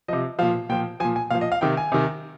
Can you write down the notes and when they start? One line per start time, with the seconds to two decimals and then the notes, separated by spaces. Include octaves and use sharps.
0.08 C3 F3 D#5
0.39 A#2 F3 F5
0.69 A#2 F3 G5
1.00 F3 G#5
1.05 A#2
1.16 G#5
1.30 A#2 F3 F5
1.41 D#5
1.52 F5
1.61 C3 D#3 G5
1.77 G#5
1.92 C3 D#3